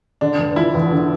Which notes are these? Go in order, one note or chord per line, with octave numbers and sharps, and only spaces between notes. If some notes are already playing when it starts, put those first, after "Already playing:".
D3 D4
F1
F3 E4
E2
D3